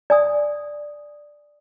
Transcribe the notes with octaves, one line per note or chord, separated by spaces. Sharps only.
D5 G#5 D#6